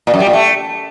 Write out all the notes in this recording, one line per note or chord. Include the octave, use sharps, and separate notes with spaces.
A#2
F#2
G3
A#2
A3